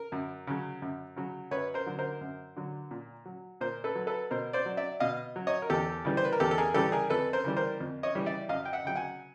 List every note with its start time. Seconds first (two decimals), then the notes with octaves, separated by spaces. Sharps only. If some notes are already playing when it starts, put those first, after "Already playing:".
Already playing: A#4
0.12 F#2
0.47 C#3 F#3
0.82 F#2
1.16 C#3 F#3
1.51 F#2 B4 C#5
1.74 A#4 C5
1.86 D3 F#3
1.99 A#4 C5
2.21 F#2
2.56 D3 F#3
2.91 A#2
3.26 F#3
3.61 A#2 A#4 C5
3.84 A4 B4
3.95 F#3
4.07 A4 B4
4.31 B2 A#4 C5
4.53 C5 D5
4.66 F#3
4.77 D5 E5
5.00 B2 D#5 F5
5.36 F#3
5.47 C#5 D#5
5.62 A#4
5.70 E2 G4 A4
6.05 C#3 E3 G3
6.17 C5
6.25 B4
6.33 A#4
6.40 E2 G4 A4
6.51 A4
6.58 G#4 A#4
6.74 C#3 E3 G3 G4 A4
6.92 G#4 A#4
7.10 F2 A4 B4
7.33 A#4 C5
7.44 C#3 E3 G3
7.57 A#4 C5
7.80 F2
8.03 C#5 D#5
8.15 C#3 E3 G3
8.26 D5 E5
8.49 F#2 D#5 F5
8.65 G5
8.73 E5 F#5
8.85 C#3 F#3 G5
8.95 F#5 G#5